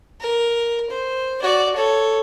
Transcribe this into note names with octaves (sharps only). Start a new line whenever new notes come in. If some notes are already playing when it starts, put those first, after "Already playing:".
A#4
C5
F#4 D5
A4 C#5